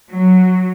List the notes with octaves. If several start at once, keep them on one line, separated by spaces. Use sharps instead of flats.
F#3